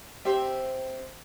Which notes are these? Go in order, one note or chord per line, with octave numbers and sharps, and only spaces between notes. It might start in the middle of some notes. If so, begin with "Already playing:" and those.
C4 G4 C5 E5